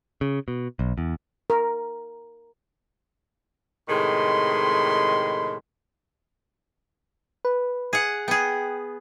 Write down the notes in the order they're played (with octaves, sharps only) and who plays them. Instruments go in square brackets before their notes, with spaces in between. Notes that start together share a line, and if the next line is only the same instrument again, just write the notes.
[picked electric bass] C#3
B2
B1
E2
[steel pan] A#4
[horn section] A2 C3 D#3 G#3 B5 C6
[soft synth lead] B4
[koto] G#4 F#5
[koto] B3 G#4 [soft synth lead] G5